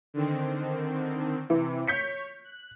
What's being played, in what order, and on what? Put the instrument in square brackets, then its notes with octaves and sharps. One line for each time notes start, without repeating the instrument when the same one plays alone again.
[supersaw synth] D3 D#3 C4
[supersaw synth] C3 [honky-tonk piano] E3
[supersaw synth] C#5 [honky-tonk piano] G6 B6 C#7
[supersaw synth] F#6